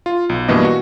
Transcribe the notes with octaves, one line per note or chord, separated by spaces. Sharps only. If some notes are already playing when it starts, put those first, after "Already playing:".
F4
B1
G2 B2 E3 A#3 D#5
F#4